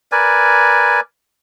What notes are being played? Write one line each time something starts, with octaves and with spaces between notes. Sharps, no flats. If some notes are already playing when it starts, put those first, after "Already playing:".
A#4 B4 D5 G#5